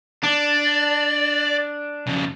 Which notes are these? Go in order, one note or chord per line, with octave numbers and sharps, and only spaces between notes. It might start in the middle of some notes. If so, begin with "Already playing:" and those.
D4 D5
F2 C#3